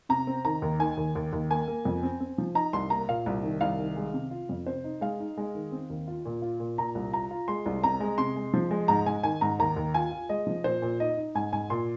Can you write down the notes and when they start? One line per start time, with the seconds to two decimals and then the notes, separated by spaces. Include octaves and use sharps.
0.09 C3 A#5
0.27 C4
0.45 D#3 A#5
0.62 D#2
0.79 D#3 G#5
0.97 D#2
1.15 D#2
1.32 D#2
1.50 A#3 G#5
1.68 A#3
1.85 F2
2.03 C4
2.20 C4
2.38 F3
2.55 D#4 A#5
2.73 C2 C6
2.90 A#3 A#5
3.09 A#2 F5
3.26 C2
3.43 D#3
3.61 C2 F5
3.78 D#3
3.96 G#3
4.14 C3
4.31 F4
4.49 F2
4.66 C3 C5
4.84 D#4
5.01 G#3 F5
5.20 D#4
5.37 G#3
5.55 D#3
5.72 C4
5.90 D#2
6.08 F4
6.26 A#2
6.42 F4
6.60 A#2
6.78 A#2 A#5
6.95 C2
7.12 F4 A#5
7.31 F4
7.48 G#3 C6
7.66 C2
7.83 C4 A#5
8.00 G#3
8.18 C3 C6
8.36 G#3
8.54 F3
8.71 G#3
8.88 G#2 A#5
9.06 G#2 G#5
9.23 D#3 G#5
9.41 G#2 A#5
9.59 D#2 A#5
9.76 D#2
9.94 F4 G#5
10.12 F4
10.29 G#3 D#5
10.47 F3
10.64 A#2 C5
10.82 A#2
11.00 D#4 D#5
11.17 D#4
11.35 G#2 G#5
11.53 G#2 G#5
11.70 A#2 C6